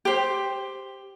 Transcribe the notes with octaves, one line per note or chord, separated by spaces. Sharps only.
G4 C5